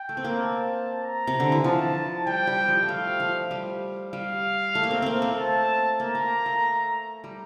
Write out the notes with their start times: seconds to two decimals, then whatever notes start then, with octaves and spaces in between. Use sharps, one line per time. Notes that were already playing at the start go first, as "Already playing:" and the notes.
Already playing: G5
0.09 A3
0.17 C4
0.24 A#3
0.40 A5
1.03 A#5
1.27 C3
1.40 D3
1.52 E3
1.64 F3 A5
2.27 G3 G5
2.47 G3
2.68 F3
2.83 A3
2.88 G3 F5
3.20 F3
3.51 G3
4.13 G3 F5
4.75 A3
4.84 A#3
4.91 C4
5.02 A#3 C4
5.22 A3
5.37 A5
5.99 A#3 A#5
6.15 A#3
6.46 A3
7.24 G3